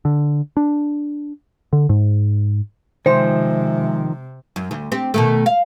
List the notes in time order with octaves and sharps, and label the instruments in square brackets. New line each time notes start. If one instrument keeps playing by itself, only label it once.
[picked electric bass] D3
D4
D3
G#2
[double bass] C3 [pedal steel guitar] D#3 F3 [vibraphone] G#3 E5 [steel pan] C5
[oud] F#2
D2
C4 G4
B2 D#3 A3
F5